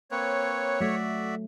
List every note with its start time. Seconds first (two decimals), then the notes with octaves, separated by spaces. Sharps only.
0.11 A#3 C4 B4 C#5
0.80 F#3 A3 F#4 D5 E5